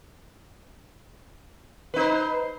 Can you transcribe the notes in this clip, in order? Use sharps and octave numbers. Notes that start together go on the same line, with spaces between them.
D#4 B4 C5